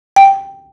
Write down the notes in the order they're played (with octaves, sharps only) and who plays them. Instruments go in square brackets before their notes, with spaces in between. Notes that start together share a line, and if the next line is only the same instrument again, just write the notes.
[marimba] G5